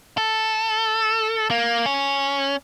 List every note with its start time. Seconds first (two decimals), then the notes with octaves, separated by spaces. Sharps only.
0.18 A4
1.51 A#3
1.86 C#4